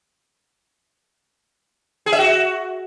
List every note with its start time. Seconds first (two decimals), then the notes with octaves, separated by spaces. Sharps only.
2.06 G#4
2.13 E5
2.19 F#4